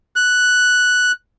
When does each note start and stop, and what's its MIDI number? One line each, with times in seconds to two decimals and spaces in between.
0.16 1.12 90